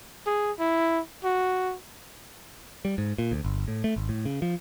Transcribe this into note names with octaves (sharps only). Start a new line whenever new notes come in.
G#4
E4
F#4
G3
G#2
A#2
D2
G1
A2
A3
G#1
A2
C#3
F3